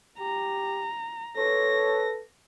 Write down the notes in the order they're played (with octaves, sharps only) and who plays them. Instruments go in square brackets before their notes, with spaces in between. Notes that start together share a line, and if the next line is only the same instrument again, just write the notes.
[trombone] G4 [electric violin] A#5
[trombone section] A4 B4 [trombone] C#5 [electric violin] A#6